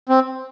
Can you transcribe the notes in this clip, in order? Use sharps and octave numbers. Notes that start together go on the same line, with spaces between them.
C4